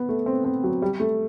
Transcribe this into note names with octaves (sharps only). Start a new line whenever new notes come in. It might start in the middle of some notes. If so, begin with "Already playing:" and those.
Already playing: B3
A3
C4
C4
F#3
G3
A3